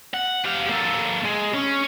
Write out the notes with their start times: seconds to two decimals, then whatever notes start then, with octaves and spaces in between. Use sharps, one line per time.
0.14 F#5
0.45 G4 F5
0.69 A#3 A4
1.25 G#3
1.54 C#4